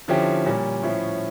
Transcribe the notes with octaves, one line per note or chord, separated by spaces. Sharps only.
D3 F3 C#4 E4 G4
A#2 G3 C#4
A2 F3 C#4 E4